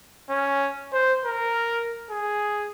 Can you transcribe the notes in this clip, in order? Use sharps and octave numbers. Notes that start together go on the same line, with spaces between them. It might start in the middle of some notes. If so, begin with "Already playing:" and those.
C#4
C5
A#4
G#4